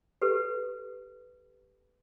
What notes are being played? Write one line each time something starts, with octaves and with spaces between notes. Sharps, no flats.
G4 A4 B4